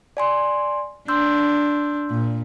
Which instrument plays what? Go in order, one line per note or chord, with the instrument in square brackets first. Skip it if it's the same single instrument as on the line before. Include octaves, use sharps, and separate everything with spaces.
[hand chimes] D5 G#5 C6
[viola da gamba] D4 [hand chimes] C6 E6 G6
[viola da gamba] A#2